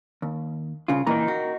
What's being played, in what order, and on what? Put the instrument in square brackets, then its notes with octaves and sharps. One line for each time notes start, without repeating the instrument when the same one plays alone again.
[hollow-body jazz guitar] D#2
C2 C#3 F4
[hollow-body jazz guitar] A#2 E3 A#3 [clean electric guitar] A#4 D#5 A#5
[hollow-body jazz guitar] F#4